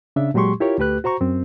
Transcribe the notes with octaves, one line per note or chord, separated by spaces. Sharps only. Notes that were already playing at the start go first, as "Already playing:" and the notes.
C#3 D4 E5
A#2 F#3 G#3 G4 C6 C#6
E4 F4 G4 A#4 C#5
D2 A3 G4 B4 F#6
F#4 C5 A#5 C#6
F#2 C4